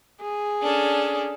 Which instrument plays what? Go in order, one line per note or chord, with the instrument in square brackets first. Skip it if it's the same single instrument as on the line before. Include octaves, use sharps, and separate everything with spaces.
[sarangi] G#4
[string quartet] C#4 D4 A4